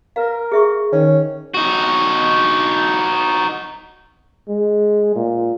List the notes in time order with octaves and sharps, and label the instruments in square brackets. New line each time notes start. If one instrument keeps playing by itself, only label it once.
[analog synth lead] A#4 [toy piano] B4 F5
[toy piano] G#4 E5 C#6
[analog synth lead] D#3 [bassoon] C#4
[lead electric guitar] D#4 F#4
[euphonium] G#3
A#2